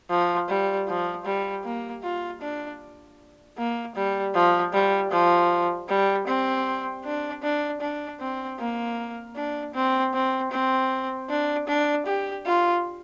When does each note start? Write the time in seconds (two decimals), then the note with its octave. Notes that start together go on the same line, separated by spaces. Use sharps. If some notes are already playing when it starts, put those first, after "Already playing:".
0.10 F3
0.49 G3
0.88 F3
1.25 G3
1.64 A#3
2.03 F4
2.42 D4
3.58 A#3
3.95 G3
4.34 F3
4.73 G3
5.11 F3
5.88 G3
6.27 C4
7.04 D4
7.43 D4
7.81 D4
8.20 C4
8.59 A#3
9.36 D4
9.74 C4
10.14 C4
10.51 C4
11.29 D4
11.68 D4
12.06 G4
12.45 F4